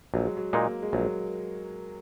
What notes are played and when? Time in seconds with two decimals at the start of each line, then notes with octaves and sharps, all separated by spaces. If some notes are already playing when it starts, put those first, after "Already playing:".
0.14 A#1 F#3
0.25 G#3
0.37 F#3
0.53 A#2 G#3 A#3 D#4
0.82 G#3
0.93 A#1 F#3